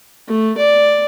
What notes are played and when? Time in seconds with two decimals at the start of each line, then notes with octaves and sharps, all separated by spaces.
0.28 A3
0.57 D5